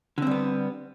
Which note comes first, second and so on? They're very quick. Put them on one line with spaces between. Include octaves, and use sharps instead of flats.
D3 C4 G3 B3